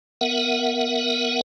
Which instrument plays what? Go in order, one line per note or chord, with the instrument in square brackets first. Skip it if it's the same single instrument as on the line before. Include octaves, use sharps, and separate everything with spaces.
[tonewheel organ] B3 A#4 E5 F#5